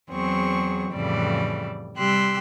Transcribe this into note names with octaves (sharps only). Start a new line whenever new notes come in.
E2 F#3 C4 G#4 C#6
F2 A2 C#3 E3 G3 D5
C3 G3 G4 C6 E6 F#6